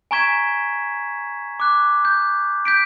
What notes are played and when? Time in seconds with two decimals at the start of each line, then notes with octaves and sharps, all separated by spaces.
0.11 G#5 A#5 C#6 G#6 B6 E7
1.60 D6 F#6
2.05 G6
2.65 G6 B6 D7